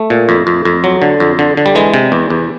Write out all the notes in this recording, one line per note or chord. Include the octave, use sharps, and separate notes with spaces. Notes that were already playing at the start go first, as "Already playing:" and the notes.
Already playing: A3
A#2
F2
F2
F2
F#3
D3
F2
D3
D3
G3
E3 G#3
C3
E2
E2